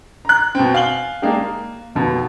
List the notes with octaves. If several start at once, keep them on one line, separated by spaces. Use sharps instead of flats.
A#5 F#6
B2 C4
F5 G#5 F#7 G7
G#3 A#3 D4 D#4 G4
A#3
F1 D#2 B2